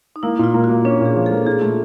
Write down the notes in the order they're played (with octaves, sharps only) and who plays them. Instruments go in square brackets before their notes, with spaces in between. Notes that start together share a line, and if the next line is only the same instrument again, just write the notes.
[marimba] D#4
[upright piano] A#3 [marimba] E4
[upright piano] A#2 [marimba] F4
[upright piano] A#3
[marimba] F#4
[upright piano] A#3
[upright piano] C#4 [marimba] D4
[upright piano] A#2 [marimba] G#4
[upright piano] F3
[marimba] A4
[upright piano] A#3
[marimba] A4
[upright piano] A#2 [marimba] G#4
[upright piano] A3